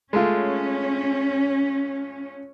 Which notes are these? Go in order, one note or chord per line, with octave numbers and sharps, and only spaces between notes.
G#3 A3 C#4 F4